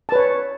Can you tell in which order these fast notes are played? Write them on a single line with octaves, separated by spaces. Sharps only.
A5 B4 C#5